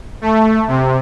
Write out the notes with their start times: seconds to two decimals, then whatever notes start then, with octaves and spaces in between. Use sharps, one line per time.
0.21 A3
0.68 C3